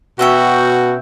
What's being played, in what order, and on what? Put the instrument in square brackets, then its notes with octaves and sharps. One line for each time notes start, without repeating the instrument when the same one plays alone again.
[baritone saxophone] B2 [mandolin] C#4 E5 G5 [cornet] F#4